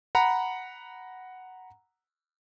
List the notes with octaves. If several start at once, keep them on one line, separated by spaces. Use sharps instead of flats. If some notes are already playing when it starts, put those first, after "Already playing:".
F#5 A#5 B5